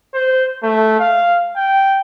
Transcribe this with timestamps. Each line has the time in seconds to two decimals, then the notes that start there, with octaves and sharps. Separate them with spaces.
0.14 C5
0.63 A3
1.00 F5
1.56 G5